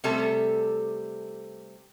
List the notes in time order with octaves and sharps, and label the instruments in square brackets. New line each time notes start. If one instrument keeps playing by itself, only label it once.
[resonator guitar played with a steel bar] C3 G3 A3 A4